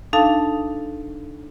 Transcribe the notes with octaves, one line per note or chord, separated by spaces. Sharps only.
D4 D#4 A4 F5 A5